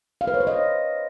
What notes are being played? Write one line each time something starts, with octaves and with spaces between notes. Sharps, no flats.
F5
B4
C#5
C5
D#5